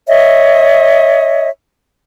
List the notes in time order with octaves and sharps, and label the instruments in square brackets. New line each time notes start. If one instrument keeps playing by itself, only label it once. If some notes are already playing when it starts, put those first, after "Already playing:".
[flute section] C#5 D#5 E5